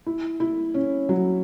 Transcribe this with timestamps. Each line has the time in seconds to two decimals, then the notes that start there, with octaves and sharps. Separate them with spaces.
0.06 E4
0.40 E4
0.74 C#4
1.09 F#3